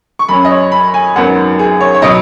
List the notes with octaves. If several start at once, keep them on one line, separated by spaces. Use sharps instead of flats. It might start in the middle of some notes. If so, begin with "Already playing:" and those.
C#6
F#2 F#3 C#4 B5
D#5
C#5
B5
G#5
G#1 F#2 D#3 F#3 B3 F#5
G#4
C#5
C#5
B2 F#3 D#5